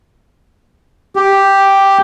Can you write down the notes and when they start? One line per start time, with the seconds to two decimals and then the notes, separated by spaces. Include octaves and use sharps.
1.16 G4